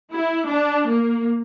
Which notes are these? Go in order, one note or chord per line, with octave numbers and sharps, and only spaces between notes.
E4
D4
A#3